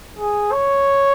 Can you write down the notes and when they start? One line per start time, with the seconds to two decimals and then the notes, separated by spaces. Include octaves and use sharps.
0.19 G#4
0.52 C#5